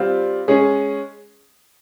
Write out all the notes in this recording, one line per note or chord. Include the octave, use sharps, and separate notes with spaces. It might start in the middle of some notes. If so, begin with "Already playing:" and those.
Already playing: G3 C4 F4
G#3 C#4 G#4